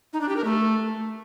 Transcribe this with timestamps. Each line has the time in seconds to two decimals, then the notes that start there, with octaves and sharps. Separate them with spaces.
0.13 D#4
0.21 D4
0.29 G4
0.37 A#4
0.44 A3